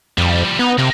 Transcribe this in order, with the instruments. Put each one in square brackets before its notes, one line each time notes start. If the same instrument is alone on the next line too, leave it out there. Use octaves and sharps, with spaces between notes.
[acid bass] F2 [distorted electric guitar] F3 G3
[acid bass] B3 [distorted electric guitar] D#4
[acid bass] C3 [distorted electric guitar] A#3 D#4